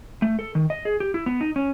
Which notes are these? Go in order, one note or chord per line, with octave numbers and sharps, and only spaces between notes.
A3
A4
D#3
D#5
G#4
G4
E4
B3
D#4
C#4